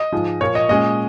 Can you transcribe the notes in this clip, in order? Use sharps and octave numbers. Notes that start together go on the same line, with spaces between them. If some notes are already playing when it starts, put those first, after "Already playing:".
Already playing: D#5
G#2 F3 G#3
A#2 F3 A#3 C#5
D#5
A#2 G#3 C#4 D#5